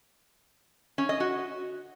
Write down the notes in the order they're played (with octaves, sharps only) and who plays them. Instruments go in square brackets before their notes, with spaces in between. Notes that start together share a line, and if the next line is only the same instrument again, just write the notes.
[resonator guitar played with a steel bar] C#4
D#5
F#4